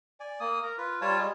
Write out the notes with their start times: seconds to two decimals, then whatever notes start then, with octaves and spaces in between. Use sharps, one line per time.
0.20 D5 G#5
0.40 A#3 D#6
0.63 A#4 A#5
0.78 F4 B4
1.02 G3 F4 C#5 A5
1.18 G3 G#3